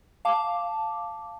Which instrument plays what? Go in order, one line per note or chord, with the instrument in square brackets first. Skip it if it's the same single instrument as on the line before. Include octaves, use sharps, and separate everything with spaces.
[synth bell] F5 A5 D6